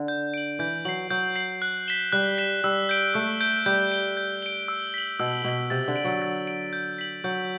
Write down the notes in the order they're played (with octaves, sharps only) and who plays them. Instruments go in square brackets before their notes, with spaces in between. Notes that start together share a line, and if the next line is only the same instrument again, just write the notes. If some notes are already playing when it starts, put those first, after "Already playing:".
Already playing: [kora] D3
[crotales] G6
D7 F#7
[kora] E3 [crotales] G6
[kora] F#3 [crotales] C7 F#7
[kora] F#3 [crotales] G6
[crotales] C7 F#7
F#6
B6 E7 G7
[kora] G3 [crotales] F#6
[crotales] B6 E7 G7
[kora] G3 [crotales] E6
[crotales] G6 D7 G7
[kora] A3 [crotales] E6
[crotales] G6 D7 G7
[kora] G3 [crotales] G6
[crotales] D7 G7
G6
D7 G7
E6
B6 F#7
[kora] B2 [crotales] E6
[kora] B2 [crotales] B6 F#7
[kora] C3 [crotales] A6
[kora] D3
[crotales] D7 F#7
[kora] F#3
[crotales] A6
D7 F#7
G6
B6 F#7
[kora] F#3 [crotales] G6